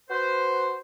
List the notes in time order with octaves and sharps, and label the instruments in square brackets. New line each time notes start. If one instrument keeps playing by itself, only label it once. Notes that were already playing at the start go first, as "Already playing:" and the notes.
[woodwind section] F#4 B4 C5